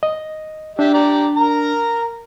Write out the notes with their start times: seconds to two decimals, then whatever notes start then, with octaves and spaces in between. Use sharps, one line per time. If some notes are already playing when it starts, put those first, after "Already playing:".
0.03 D#5
0.79 D4 G4 E5
0.94 G4 D5 A#5
1.36 A#4 A#5